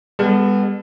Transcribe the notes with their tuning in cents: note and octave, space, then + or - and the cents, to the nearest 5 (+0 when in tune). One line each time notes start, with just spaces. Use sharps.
G3 +45 B3 +0 A4 +0